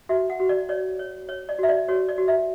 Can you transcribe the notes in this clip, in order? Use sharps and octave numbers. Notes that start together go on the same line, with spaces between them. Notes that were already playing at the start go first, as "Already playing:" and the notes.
F#4 E5
F#5
F#4
D5
C#5 D5
C#5
C#5
D5
F#4 E5
D5
F#4 C#5
D5
F#4
E5